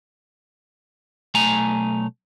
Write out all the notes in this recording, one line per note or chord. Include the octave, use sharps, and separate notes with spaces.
B1 A3 G#5 A#5